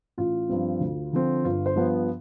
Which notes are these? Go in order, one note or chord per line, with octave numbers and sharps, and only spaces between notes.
A1 F4
G2 F3 C4
D2
D3 F3 C4
G1 F4
C5
G2 F3 B3